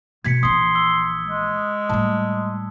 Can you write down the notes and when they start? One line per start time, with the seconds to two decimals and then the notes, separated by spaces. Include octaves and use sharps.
0.25 B2 B3 G#6 B6 C#7
0.43 A#1 E3 C6 D#6
0.75 E6 G7
1.28 G#3
1.89 A2 G3 A5